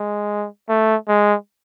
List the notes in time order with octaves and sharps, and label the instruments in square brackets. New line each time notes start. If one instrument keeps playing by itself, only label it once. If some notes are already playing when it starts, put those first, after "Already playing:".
Already playing: [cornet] G#3
A3
G#3